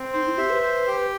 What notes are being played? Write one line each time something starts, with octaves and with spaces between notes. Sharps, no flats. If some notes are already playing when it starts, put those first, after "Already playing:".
Already playing: C4
D#4 C5
E4
G4 E5
B4
C5
G4